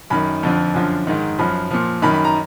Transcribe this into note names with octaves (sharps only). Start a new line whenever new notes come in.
F#2 D#3 B5
F2 D3 F3
F#2 D3 F3
G#2 D#3
F#2 F3 B5
A#2 F3
F#2 D#3 B5
B5
A#5